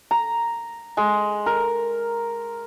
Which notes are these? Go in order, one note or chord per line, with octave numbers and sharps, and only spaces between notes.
A#5
G#3
A#4